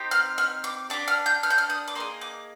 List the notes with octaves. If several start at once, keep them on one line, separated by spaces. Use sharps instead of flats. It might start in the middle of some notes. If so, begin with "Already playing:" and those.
Already playing: C4 D#4 G4
F6
F6
D6
D4 G4 D6
F6
G6
F6
G6
F6
D#6
D6
A#3 D#4 G#4 C6
D6